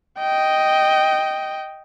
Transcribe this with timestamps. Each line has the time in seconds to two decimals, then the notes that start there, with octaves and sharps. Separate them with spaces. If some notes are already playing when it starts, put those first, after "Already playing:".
0.19 D#5 G5